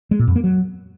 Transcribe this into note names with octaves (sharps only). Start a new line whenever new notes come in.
G#3
A#2
F2
A#3
F#3